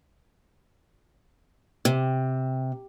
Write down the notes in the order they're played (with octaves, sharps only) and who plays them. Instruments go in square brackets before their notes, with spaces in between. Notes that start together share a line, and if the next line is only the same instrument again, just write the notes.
[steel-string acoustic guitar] C3